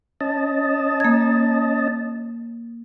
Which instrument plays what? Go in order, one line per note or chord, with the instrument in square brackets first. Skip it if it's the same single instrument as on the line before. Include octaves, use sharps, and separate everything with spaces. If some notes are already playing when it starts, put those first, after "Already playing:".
[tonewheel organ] C#4 D#5 A5
[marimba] A#3 G#6